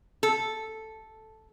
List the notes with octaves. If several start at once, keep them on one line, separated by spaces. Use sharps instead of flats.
A4